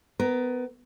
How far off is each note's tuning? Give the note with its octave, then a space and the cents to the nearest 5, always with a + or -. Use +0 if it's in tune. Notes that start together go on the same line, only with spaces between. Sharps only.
B3 +20 A#4 +5